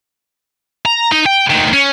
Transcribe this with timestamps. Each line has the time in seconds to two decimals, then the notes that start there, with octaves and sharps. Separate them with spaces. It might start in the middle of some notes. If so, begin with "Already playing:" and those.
0.85 A#5
1.12 D#4
1.26 G5
1.50 D2 D#3
1.73 C#4